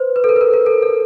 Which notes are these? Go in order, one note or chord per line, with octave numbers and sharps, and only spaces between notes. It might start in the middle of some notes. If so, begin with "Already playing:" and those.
Already playing: B4 C5
B4
A4
A#4
B4
A#4
A#4
A4
A4